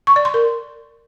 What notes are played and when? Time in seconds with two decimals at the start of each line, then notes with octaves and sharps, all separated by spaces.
0.07 C#6
0.16 D5
0.25 C6
0.34 A#4